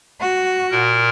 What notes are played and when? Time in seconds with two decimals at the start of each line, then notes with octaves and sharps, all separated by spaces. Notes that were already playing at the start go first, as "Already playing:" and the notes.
0.20 F#4
0.71 A#2 A#4